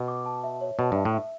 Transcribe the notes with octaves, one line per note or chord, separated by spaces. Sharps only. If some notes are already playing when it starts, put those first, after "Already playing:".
Already playing: B2
D6
A5
E5
C#5
B2 A5
G2 E5
A2
E5